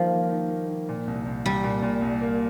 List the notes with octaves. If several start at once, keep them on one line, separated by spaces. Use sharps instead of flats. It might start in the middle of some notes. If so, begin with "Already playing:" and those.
Already playing: D#3 F3 G3 A#3
A#3
D#3
A#3
D#3
A#2
C2
C2
C2 G3
A#2
A#2
C2
A#3